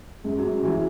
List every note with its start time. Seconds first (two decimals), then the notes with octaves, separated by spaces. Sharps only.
0.24 F#2 G#3
0.38 F#3
0.44 F#2
0.63 E3 F#3